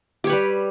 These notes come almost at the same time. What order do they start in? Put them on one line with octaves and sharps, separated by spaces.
G4 C#5 B4 G3